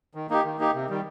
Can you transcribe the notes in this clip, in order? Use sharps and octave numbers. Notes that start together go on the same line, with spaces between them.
D#3
A#3 D#4 G4
D#3
A#3 D#4 G4
C3
D#3 G3